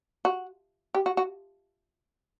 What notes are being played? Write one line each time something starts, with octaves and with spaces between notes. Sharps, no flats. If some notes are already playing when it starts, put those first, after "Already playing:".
F#4
G4
F#4
F#4